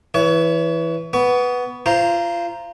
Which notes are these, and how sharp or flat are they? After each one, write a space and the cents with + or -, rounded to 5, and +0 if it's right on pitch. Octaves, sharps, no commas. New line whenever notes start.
E3 +0 C#5 +30
B3 +0 C#6 +25
F4 -25 C5 +0 A#5 +0